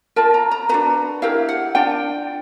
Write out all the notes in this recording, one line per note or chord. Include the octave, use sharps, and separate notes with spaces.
F4 A#4 A5
A#5
A#5
D4 F#4 B4 A#5
E4 G4 A#4 F5
F#5
D4 F4 G5